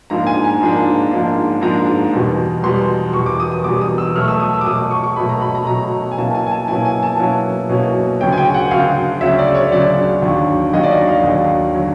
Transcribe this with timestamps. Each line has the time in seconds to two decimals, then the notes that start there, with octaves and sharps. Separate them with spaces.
0.10 G#2 F3 A#3 D4 A#5
0.27 G#5
0.44 G#5
0.61 G#2 F3 A#3 D4
1.11 G#2 F3 A#3 D4
1.61 G#2 F3 A#3 D4 A#5
2.13 E2 B2 G3
2.63 E2 B2 G3 C6
3.13 E2 B2 G3 C#6
3.26 D6
3.40 D#6
3.52 D#6
3.64 E2 B2 G3 D6
3.81 D#6
3.98 E6
4.15 B2 F#3 A3 F6
4.28 E6
4.40 D#6
4.53 E6
4.61 D6
4.66 B2 F#3 A3 D#6
4.78 D6
4.91 C#6
5.04 C#6
5.16 B2 F#3 A3 B5
5.29 A#5
5.41 B5
5.55 A#5
5.67 B2 F#3 A3 A#5
6.12 G#5
6.17 B2 F#3 A#3 C#4 E4 A5
6.35 G#5
6.47 G#5
6.51 A5
6.68 B2 F#3 A#3 C#4 E4 G#5
6.85 G#5
7.03 A5
7.19 B2 F#3 A#3 C#4 E4
7.69 B2 F#3 A#3 C#4 E4
8.20 D2 C#3 F#3 G5
8.33 G#5
8.38 G5
8.54 F#5
8.71 D2 C#3 F#3 F5
9.21 D2 C#3 F#3 E5
9.39 D5
9.55 C#5
9.72 D2 C#3 F#3 D5
10.22 D#2 D3 F#3
10.73 D#2 D3 F#3 D#5
10.83 D5
10.91 D#5
11.07 F5
11.23 D#2 D3 F#3
11.74 D3 F#3